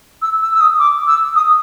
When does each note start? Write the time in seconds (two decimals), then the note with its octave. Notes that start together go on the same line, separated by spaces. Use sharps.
0.22 E6
0.41 E6
0.54 E6
0.61 D#6
0.79 D6
1.07 E6
1.35 D#6